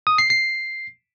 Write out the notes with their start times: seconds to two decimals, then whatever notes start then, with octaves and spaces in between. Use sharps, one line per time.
0.07 D#6
0.18 C7
0.30 C7